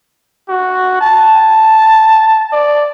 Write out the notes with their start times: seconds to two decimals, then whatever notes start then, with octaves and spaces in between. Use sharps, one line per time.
0.49 F#4
1.01 A5
2.53 D5